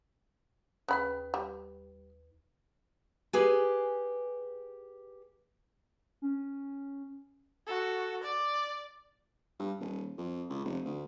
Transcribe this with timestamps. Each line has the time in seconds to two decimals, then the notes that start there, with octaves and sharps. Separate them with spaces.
0.88 D#2 C#3 B4 B5
1.34 G3
3.33 G4 G#4 B4 G#5
6.22 C#4
7.66 F#4 A4
8.23 D5
9.59 G2
9.80 D#1
10.18 F2
10.50 C#2
10.65 F1
10.85 D2